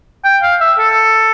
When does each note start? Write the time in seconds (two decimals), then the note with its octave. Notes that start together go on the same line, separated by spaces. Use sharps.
0.25 G5
0.43 F5
0.61 E5
0.79 A4